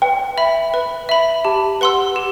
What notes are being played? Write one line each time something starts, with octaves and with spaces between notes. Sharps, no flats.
B4 G5
E5 B5
B4
E5 B5
G4 A5
B4 F#5 C6 E6
G4